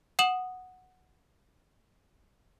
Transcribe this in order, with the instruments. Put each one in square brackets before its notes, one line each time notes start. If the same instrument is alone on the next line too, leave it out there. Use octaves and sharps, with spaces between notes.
[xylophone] F#5 D#6 E7 F#7